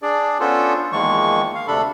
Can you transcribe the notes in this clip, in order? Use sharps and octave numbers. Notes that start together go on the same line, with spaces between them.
D4 G#4 D5
B3 C#4 D4 F4 A4 C5
E2 D#3 F3 G#3 A#3 C#6
F5
D2 C3 D4 A4 B5